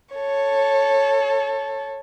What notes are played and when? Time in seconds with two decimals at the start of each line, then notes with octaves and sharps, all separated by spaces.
0.14 A4 C#5